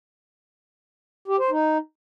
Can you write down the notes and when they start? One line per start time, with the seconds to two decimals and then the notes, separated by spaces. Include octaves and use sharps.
1.28 G4
1.39 C5
1.50 D#4